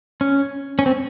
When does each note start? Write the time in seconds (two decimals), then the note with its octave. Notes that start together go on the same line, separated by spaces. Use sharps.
0.21 C#4
0.79 C#4
0.86 C4